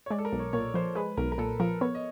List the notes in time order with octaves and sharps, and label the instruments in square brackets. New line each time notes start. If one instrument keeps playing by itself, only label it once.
[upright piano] C#5
[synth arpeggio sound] G#3 [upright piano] D5
[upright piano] A4
A#4
[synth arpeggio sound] B1
[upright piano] C#5
[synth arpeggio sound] A#2 [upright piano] C#5
[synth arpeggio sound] F3 [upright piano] C5
[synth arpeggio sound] G#3 [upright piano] B4
[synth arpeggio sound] B1 [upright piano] A#4
[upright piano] A#4
[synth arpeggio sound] A#2 [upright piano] A4
[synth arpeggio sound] F3 [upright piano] A#4
[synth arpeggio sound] B3 [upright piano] C#5
[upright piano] D#5